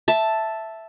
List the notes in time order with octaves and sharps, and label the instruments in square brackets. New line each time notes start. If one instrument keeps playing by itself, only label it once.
[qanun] E5 A5